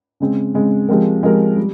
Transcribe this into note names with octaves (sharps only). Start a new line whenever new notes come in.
C#3 G#3 C4
C#3 G#3 C4
F3 G#3 C4 G4 A#4
F3 G#3 C4 G4 A#4
G3